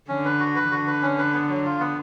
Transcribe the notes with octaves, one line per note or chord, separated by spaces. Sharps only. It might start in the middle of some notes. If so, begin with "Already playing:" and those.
D3 C#4
B4
F#4
B4
D3 F#4
B4
C#4
B4
B3
F#3
F4
B3